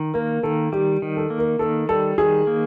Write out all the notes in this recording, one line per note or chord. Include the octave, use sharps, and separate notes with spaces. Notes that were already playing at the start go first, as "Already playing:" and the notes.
Already playing: D#3
A#3 A#4
D#3 A4
G3 G4
D#3
A4
A#3
A#4
D#3 A4
G3 A4
D#3 G#4
A#3